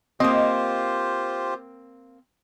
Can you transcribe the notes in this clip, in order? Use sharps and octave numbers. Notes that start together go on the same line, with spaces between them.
A#3 C4 F4 G4 C5 D#5